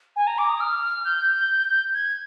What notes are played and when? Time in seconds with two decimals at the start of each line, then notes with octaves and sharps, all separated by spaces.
0.16 G#5
0.27 A#5
0.38 D6
0.49 D#6
0.61 F6
1.05 G6
1.94 G#6